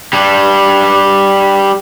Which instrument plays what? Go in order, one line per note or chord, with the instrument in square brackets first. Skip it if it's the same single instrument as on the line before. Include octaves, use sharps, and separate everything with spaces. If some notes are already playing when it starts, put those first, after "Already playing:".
[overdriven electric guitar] G3 D4